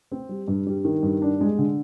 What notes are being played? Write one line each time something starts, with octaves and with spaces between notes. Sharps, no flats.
C4
G3
G2
G3
D#3
G2
D4
G#3
D3